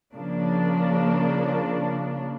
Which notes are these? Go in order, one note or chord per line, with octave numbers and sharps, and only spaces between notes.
C#3 F3 A#3 D4